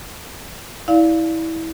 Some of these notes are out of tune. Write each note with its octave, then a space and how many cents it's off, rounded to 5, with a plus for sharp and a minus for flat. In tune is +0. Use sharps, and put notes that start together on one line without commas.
E4 -25 D5 +0 F5 +0